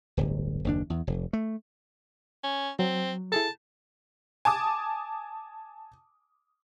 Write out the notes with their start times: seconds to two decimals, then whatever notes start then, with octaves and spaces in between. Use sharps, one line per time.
0.17 D1 G1
0.65 F#1 D#2 D4
0.90 E2
1.07 F1
1.33 A3
2.43 C#4
2.79 F#3 C4
3.32 E4 G#4 A4 A5
4.45 G#5 A5 D6 D#6